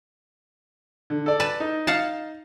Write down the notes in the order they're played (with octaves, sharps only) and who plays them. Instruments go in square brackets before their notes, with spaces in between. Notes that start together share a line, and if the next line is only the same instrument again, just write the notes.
[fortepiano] D3
A4 D5
[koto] B4 A5
[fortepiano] D#4
[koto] F5 F#5 A5